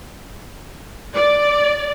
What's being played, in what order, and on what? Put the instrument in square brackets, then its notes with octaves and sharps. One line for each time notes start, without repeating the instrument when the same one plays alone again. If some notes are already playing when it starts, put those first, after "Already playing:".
[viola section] D5